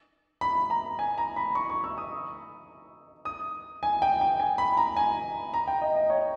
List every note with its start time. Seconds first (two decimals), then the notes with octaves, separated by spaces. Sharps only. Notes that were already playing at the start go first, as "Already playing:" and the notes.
0.41 B5
0.70 A#5
0.99 G#5
1.18 A#5
1.36 B5
1.55 C#6
1.70 C#6
1.84 E6
1.98 D#6
3.25 D#6
3.83 G#5
4.02 G5
4.21 G5
4.40 G#5
4.58 B5
4.77 A#5
4.97 G#5
5.54 A#5
5.68 G5
5.82 D#5
5.96 D#5
6.10 C#5